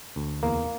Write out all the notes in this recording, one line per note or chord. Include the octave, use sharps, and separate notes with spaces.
D2
E2 A#3